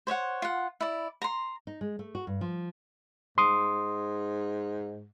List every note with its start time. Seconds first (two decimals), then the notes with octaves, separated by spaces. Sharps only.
0.07 C5 C#5 E5 F#5
0.42 F4 F#5
0.81 E4 D5
1.22 A#5 C6
1.67 D#4
1.81 G#3
1.99 A3
2.15 F#4
2.27 G2
2.41 F3
3.38 G#2 C6 D#6